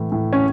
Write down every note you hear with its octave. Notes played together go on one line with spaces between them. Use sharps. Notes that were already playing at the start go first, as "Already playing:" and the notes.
Already playing: A2 E3
A2
C#4